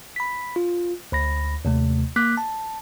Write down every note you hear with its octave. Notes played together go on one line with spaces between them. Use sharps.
B5 B6
F4
D2 B5 A#6
D#2 C3 A3
A#3 D6 F#6 B6
A5